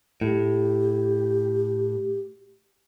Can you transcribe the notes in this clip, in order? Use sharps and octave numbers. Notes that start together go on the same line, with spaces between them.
A2 G4